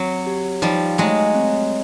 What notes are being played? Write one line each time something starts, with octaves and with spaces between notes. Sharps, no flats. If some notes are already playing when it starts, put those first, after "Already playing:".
Already playing: F#3 C4
G4
F3 G3 D#4
F#3 G#3 A3
C4